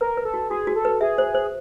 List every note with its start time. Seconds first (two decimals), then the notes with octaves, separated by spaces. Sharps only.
0.01 A#4 B4
0.17 B4
0.25 A4
0.34 F#4
0.50 F#4 G#4
0.67 F#4
0.76 A4
0.85 B4
1.01 G#4 E5
1.18 C5
1.34 C5